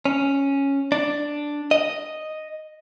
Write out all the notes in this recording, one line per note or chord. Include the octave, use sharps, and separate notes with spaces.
C#4
D4
D#5